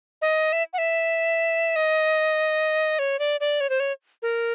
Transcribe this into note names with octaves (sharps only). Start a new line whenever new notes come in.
D#5
E5
F#5
E5
D#5
C#5
D5
D5
C#5
C5
C#5
A#4